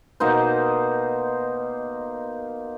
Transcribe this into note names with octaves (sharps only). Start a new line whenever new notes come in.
B2 A#3 D#4 C5